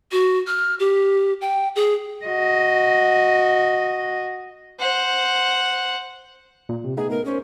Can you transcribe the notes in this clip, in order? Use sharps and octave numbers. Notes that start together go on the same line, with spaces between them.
F#4
F6
G4
G5
G#4
F#4 D#5
C5 F#5
A#2
C3
A3 B3 D#4 G#4
A#4
C#4 A#4 C5